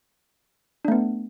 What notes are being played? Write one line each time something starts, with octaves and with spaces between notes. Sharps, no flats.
A3 B3 D4